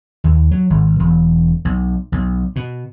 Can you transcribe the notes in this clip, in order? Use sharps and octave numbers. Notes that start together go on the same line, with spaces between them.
D#2
F#3
G#1
E1
B1
B1
B2